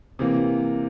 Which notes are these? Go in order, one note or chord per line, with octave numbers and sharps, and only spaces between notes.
C3 E3 A#3